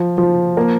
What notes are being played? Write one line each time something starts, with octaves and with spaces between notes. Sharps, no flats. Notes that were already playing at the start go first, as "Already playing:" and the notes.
Already playing: F3
F3
A#3